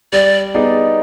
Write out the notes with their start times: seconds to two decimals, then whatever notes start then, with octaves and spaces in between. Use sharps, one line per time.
0.13 G3 D5
0.54 B3 D#4 G#4 D5